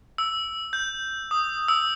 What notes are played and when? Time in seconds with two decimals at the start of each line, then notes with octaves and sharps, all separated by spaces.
0.18 E6
0.73 G6
1.31 D#6
1.68 E6